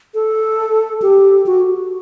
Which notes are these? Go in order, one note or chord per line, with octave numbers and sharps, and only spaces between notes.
A4
G4
F#4